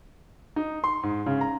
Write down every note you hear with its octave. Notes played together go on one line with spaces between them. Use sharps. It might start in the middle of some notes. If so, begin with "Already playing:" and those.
D#4
C6
G#2
C#3
A#5